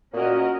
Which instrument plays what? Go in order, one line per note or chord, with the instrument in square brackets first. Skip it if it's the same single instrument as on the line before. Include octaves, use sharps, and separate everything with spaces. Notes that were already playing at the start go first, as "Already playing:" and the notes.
[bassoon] A#2 [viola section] C#4 F#4 A#4 D#5